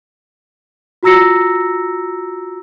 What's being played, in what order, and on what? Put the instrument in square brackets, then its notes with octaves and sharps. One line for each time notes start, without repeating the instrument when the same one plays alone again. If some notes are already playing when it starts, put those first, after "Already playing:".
[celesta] F4 F#4 A#5 E6 A#6 C#7